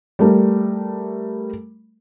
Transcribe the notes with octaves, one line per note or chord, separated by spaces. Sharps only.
G3 A3 A#4